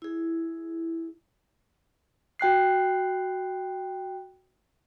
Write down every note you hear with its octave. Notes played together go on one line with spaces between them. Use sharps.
E4 G#4
F#4 G5 F#6 C7